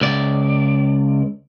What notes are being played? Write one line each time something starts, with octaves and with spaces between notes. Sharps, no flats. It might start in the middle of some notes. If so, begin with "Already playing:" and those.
C#2 D5